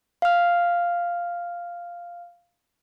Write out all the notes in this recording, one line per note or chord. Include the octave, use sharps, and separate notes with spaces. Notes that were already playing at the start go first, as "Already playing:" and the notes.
F5 F6